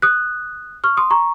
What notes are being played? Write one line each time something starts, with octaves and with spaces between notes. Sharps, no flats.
D#6 F#6
C#6 F6
C6 D#6
A#5 C#6